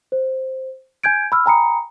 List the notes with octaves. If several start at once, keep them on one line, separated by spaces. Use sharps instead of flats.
C5
G#5 G6 G#6 D7
B5 E6 F6
G5 G#5 A#5 B5 D#6 C#7